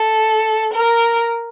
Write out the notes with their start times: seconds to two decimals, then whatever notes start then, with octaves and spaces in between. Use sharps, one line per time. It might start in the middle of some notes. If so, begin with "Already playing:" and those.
Already playing: A4
0.73 A#4